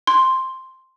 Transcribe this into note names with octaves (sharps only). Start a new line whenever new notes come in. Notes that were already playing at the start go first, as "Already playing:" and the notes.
C6